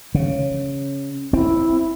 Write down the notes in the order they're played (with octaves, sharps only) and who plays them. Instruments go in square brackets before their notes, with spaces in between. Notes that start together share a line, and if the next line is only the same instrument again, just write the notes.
[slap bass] C#3
[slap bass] C4 [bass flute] E4